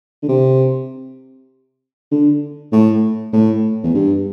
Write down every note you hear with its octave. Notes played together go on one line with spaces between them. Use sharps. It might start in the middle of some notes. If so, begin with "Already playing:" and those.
D3
C3
D3
A2
A2
E2
G2